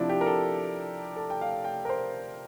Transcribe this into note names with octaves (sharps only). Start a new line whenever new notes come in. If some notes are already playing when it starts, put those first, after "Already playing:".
Already playing: C3 F3 D4 E4
G4
A#4
A4
A4
G5
F5
G5
A#4
C5